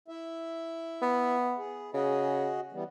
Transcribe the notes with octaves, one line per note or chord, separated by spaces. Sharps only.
E4 E5
B3
G#4
C#3 F#4 G#4 D#5
E3 G3 B3